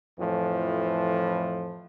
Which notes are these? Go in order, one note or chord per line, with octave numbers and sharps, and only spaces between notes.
F2 A2 E3 F3